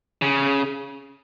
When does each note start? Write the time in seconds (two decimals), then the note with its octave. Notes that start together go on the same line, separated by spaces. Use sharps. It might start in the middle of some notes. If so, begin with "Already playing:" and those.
0.22 C#3